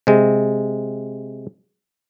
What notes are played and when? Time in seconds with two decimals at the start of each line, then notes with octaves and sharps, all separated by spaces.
0.07 C3 G#3